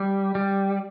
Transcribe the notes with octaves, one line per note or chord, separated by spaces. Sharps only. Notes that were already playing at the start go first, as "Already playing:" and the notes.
Already playing: G3
G3